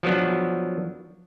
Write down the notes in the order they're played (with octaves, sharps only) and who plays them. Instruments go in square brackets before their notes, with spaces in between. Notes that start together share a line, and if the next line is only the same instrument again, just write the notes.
[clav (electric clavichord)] F3 F#3 B3 D4